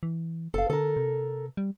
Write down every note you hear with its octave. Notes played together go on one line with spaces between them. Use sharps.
E3
F#1 A4 F5
D3 A4 A#4
C3
G3